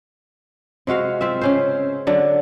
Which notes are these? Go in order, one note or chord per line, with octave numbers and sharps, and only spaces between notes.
C3 G#3 F#4 F5
C4 F4 E5
C#3 C#4 C5
D3 F#3 D4